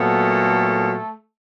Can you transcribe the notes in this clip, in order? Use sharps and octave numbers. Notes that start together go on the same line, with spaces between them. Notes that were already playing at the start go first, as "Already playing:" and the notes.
Already playing: A#2 F#3 A3 B3 A4